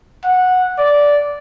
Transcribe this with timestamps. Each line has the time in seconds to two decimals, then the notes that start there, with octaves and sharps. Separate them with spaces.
0.24 F#5
0.78 D5